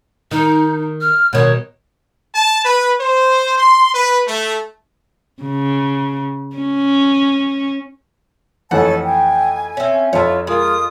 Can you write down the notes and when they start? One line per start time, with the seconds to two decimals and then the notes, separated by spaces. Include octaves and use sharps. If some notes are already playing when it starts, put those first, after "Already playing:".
0.31 D#3 D#4
1.01 F6
1.33 B2 D#3 C#5
2.34 A5
2.64 B4
3.01 C5
3.57 C6
3.94 B4
4.27 A3
5.43 C#3
6.56 C#4
8.71 F2 E3 A3 A4 C#5 F#5 G#5 A5
9.03 G5 G#5
9.77 C4 C#4 E5
10.13 F2 E4 F4 C#5 A5
10.47 G#3 F4 A#4 D#6